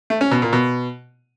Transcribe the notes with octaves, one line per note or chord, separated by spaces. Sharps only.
A3
C#4
B2
A#2
B2